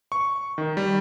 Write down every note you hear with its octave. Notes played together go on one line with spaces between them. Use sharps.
C#6
D#3
G3